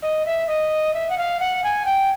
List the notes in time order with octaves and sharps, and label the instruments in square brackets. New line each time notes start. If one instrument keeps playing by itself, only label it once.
[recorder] D#5
E5
D#5
E5
F#5
F5
F#5
G#5
G5